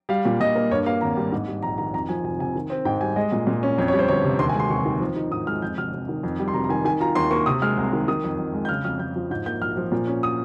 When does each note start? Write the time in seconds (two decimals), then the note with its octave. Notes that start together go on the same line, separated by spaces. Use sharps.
0.09 G3 F5
0.25 A#2
0.40 A#2 D#5
0.56 A#3
0.71 G2 C#5
0.86 A#3 F5
1.01 G#1 A#5
1.17 G3
1.32 G#2
1.47 G3
1.62 A#1 A#5
1.78 D#3 A#5
1.93 F2 A#5
2.09 F3 G#5
2.24 F1 G#5
2.39 C3 G#5
2.55 D#3
2.70 C4
2.85 G#2 G5
3.01 G3 G#5
3.16 G#3 D#5
3.32 A#2
3.47 A#2
3.63 C#4
3.78 F2 C#5
3.88 C#5
3.93 G3
3.99 C5
4.08 G1 C#5
4.24 C3
4.39 D#2 C6
4.49 G#5
4.55 G#3 C6
4.70 F1 C#6
4.86 D#3
5.01 F3
5.16 D#4
5.31 G#2 D#6
5.47 G#3 F6
5.62 F2 G6
5.78 F1 F6
5.93 F1
6.09 D#3
6.23 F2
6.39 G3
6.48 C6
6.54 F1 A#5
6.64 A#5
6.69 D#3 G#5
6.85 D#3 G#5
7.00 F4 A#5
7.15 D#2 C6
7.31 A#3 C#6
7.46 C3 D#6
7.62 G#3 F6
7.77 C2
7.93 D#3
8.08 D#3 D#6
8.24 F2
8.38 F2
8.54 G#3
8.65 G6
8.69 C#3 F6
8.85 F2 F6
8.99 F2 G6
9.16 F3
9.31 G#2 G6
9.46 A#3 G6
9.61 A#1 F6
9.77 F3
9.92 A#2
10.07 C#4
10.23 D#6